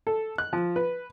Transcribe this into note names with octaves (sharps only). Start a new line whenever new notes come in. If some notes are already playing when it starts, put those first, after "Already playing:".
A4
F#6
F3
B4